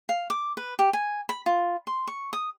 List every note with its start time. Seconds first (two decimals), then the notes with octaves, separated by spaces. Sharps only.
0.09 F5
0.30 D6
0.57 B4
0.79 G4
0.93 G#5
1.29 B5
1.46 F4
1.87 C6
2.07 C#6
2.33 D#6